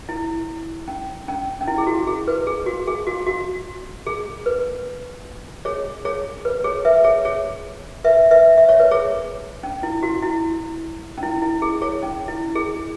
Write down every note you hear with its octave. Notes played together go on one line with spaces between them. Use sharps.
E4
C#4
C#4
C#4
E4
G#4
F#4
G#4
B4
G#4
F#4
G#4
F#4
F#4
G#4
B4
G#4 C#5
G#4 C#5
B4
G#4 C#5
B4 E5
G#4 C#5
G#4 C#5
B4 E5
B4 E5
E5
C#5
B4
G#4 C#5
C#4
E4
F#4
E4
C#4
E4
E4
G#4
G#4 C#5
C#4
E4
G#4